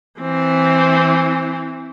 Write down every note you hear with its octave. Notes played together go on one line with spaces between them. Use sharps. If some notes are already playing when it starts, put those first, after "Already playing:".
E3 C4